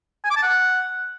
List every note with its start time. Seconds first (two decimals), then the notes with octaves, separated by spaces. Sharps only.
0.24 G#5
0.30 D6
0.36 A5
0.42 F#5